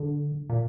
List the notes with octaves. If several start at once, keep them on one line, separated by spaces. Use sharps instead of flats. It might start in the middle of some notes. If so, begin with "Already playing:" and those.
Already playing: D3
A#2